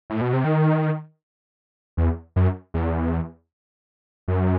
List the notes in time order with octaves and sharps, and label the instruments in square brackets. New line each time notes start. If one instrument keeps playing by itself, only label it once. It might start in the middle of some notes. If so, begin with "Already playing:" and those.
[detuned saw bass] A2
B2
C3
D#3
E2
F#2
E2
F#2